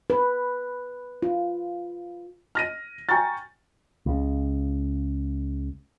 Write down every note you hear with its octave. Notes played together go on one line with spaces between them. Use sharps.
B4
F4
F6 A#6 D#7
G5 G#5 A#5 C#6 F6 A6
C#2 C#3